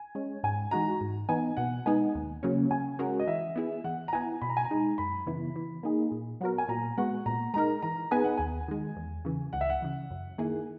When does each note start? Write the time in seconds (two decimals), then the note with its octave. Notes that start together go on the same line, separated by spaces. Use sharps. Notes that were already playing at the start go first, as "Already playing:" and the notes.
Already playing: G#5
0.15 G#3 C#4
0.44 G#2 G#5
0.71 E3 G#3 D#4 F#4 A#5
1.01 G#2
1.29 E3 B3 D#4 G#5
1.57 B2 F#5
1.86 G#3 B3 D#4 G#5
2.15 D#2
2.43 C#3 F#3 A#3 C#4
2.71 C#3 G#5
2.99 G#3 C#4 F#4 A#4 F#5
3.19 D#5
3.28 E3 E5
3.56 B3 E4 G#4
3.84 E3 F#5
4.08 A#5
4.13 B3 E4 G#5
4.41 B2 B5
4.50 A#5
4.57 G#5
4.64 A#5
4.71 G#3 D#4
4.98 F#2 B5
5.26 C#3 E3 B3 E4
5.56 E3
5.83 A#3 D#4 G#4
6.12 A#2
6.41 F#3 B3 F#4 A#4
6.58 G#5
6.68 A#2 A#5
6.98 G#3 B3 F#4 F#5
7.26 A#2 A#5
7.54 G#3 D#4 A#4 A#5
7.82 E3 A#5
8.11 B3 D#4 G#4 B4 G#5
8.24 F#5
8.37 D#2 G#5
8.68 D#3 G#3
8.96 E2
9.25 C#3 E3
9.53 C#2 F#5
9.61 E5
9.70 F#5
9.82 C#3 E3
10.11 F#2
10.38 D#3 A#3 E4 G#4